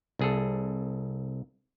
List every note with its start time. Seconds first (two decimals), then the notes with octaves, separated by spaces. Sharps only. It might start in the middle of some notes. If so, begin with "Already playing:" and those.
0.19 C2 G#4 A4